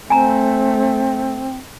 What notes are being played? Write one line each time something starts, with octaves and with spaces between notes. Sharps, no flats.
A3 C4 G#5 A#5